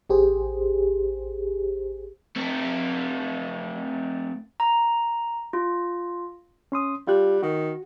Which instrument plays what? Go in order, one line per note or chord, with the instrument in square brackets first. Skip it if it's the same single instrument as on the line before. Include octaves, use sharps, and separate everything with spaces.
[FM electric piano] A1 G4 G#4 C5
[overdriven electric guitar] A3 C4
[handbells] A#5
F4
[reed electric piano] C#4 C6 D#6
[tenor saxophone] G3 [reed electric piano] F4 G4 F#6
[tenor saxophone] D#3 [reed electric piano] F#4